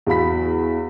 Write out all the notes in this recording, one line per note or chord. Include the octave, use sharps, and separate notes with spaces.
E2 F#4 F5 B5 B6